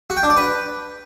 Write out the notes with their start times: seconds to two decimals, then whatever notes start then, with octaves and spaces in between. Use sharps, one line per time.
0.10 F#4
0.17 G5
0.23 D4
0.30 D5
0.37 B4